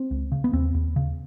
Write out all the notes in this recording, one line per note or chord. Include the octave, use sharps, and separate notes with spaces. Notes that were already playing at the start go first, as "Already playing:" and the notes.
Already playing: C4
C#2
C#3
B3
D#2 C4
D#2
C#3